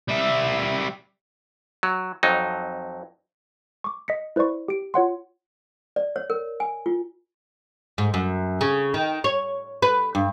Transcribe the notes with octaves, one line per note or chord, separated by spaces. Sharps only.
G3 E5
F#3
F2 F#3 D#4
C#6 D6
D#5 B6 C#7
E4 B4 C5 D5 C#6
G4 D7
F4 C#5 F#5 C6
D5
C#5
A#4
G#5
F4
G#2
F#2
C#3
D#3
C#5
B4
G2